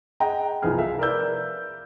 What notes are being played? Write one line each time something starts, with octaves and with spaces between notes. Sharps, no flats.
G#4 D#5 F#5 G5 A#5
C2 F3 B3 E4 G#4 F6
A4 E5 F5
A#4 B4 D5 E6 G6